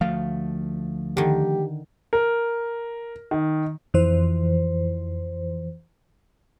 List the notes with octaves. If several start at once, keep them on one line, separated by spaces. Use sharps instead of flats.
D2 F3 A3 F5
D3 D#3 G4
A#4
D#3
F2 E3 C5